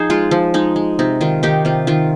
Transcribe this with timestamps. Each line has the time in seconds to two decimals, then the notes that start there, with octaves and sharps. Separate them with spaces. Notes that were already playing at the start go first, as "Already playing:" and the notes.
Already playing: F3 D#4 G#4 C5
0.10 G#3 F4
0.31 F3
0.54 G#3 D#4
0.76 G#3
0.99 C3 D#4
1.21 D#3 F4
1.43 D#3 D#4 G4
1.65 C3 F4
1.87 D#3 F4